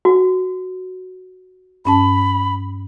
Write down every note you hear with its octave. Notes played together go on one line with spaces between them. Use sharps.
F#4
G2 C#4 A5 B5